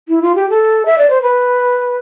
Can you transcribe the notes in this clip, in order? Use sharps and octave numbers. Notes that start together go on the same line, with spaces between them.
E4
F4
G4
A4
E5
D5
C5
B4